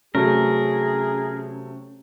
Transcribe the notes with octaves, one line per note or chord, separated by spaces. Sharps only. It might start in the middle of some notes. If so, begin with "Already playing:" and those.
C3 F#3 A3 C#4 G#4 A#4